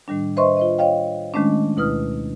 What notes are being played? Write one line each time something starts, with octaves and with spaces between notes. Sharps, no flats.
A2 D#3 G3 D4
B4 C5 D#5 E5 C6 C#6
F4 C5 D#5
C#5 D#5 F5 G5
D#3 G#3 A3 C#4 D4
D2 B2 E4 B4 D#6 F6